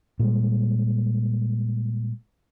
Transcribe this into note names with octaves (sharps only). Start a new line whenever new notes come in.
A#2 G3 G#3